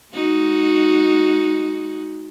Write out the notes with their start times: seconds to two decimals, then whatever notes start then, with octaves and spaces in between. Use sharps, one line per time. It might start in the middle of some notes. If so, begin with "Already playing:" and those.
0.13 G#3 D#4 F#4